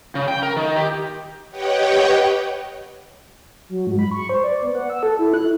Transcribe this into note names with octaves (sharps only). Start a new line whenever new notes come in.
C#3
G5
A#4
D#3
G4
G4 B4 C#5 D#5 F#5 G5
F#3
G#2
B5
C#6
C5
D5
B3
F#5
E6
A4
E4
F#6